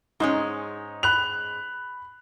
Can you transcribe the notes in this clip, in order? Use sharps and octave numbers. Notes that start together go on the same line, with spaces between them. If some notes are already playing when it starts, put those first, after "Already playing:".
G#2 G#3 C#4 D#4
B5 F#6 F7